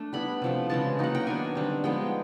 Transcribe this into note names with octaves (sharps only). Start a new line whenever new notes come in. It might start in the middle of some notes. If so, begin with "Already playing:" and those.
Already playing: A3 D4
G3 B3 E4 B5
C3 F3 A3
C#3 E3 G#3 A5
F#3 A#3 D#4 F#5
G5
D#3 F#3 B3 D4 G#5
D3 G3 C4
F3 G#3 B3 D#4 G5